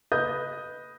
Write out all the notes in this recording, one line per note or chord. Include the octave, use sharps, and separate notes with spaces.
B4 D#5 D#6 G6